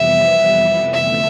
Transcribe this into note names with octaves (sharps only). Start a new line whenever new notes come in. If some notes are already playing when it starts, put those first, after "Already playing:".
Already playing: F2 C3 E3 G3 B3 E5
D3 F3 A3 E5